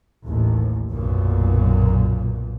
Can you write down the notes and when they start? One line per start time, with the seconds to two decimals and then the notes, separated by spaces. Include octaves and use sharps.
0.25 A1 D#2
0.91 B1 F#2 A#2